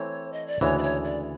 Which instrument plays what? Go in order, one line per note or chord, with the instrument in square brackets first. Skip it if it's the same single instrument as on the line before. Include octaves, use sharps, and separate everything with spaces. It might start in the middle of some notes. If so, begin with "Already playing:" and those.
Already playing: [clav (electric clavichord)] E3 A3 C4 [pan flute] C#5
[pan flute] D#5
D5
[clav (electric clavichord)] D2 C#3 E3 G#3 [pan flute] C#5
[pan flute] D5
C#5
D5